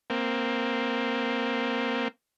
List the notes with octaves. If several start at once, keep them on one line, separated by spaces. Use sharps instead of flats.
A#3 C4